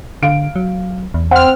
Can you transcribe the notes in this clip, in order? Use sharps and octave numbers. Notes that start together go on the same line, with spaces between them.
D3 F5 D7
F#3
E2
C4 F#5 F6